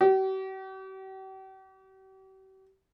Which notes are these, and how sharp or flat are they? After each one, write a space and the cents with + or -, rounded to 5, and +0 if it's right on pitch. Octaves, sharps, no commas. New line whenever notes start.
G4 -45